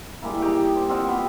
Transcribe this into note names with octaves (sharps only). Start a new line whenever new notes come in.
G3 G#3 A#3 E4
D#4 G4
C5
C4 D#4 F4 F#5
B3 G4